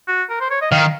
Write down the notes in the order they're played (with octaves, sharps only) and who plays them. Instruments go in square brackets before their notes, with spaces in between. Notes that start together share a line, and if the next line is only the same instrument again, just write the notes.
[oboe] F#4
A#4
C5
C#5
D#5
[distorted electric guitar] D#3 [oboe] F5